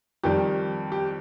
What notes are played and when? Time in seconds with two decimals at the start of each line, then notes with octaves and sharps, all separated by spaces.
0.23 F2 D#3 G3 G4
0.92 G4